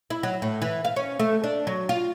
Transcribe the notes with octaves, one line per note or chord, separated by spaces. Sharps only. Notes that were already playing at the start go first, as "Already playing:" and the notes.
E4
F#3
A2
E3
F5
C#4
A3
D4
F#3
F4